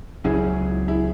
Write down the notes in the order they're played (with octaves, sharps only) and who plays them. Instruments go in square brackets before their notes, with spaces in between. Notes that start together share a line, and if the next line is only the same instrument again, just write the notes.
[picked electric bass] C#2 C#3 F#3 C#4 [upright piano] E4 G#4
[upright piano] E4 G#4